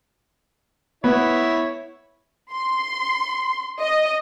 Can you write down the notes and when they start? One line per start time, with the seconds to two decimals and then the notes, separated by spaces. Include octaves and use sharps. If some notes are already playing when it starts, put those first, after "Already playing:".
1.04 B3 E4 C#5
2.52 C6
3.80 D#5